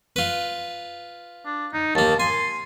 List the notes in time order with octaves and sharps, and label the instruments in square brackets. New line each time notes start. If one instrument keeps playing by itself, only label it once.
[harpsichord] F4 B4
[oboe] D4
D#4
[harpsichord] D#2 A#3 [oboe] A5
[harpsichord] G#5 [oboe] C6